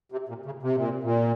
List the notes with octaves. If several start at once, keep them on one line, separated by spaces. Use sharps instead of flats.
C3
A#2
C#3
C3
A#2
A#2